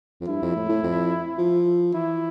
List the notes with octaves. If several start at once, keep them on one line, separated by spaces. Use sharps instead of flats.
F2
G2 E4
F2
A2
A2
F2
F3
E3 E4